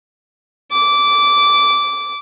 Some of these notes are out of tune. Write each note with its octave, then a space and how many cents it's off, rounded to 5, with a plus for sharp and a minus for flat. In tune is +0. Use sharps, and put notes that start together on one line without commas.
D6 -15